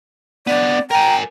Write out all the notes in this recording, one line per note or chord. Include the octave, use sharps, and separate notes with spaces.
B3 D4 D5
A#4 G5 G#5 A#5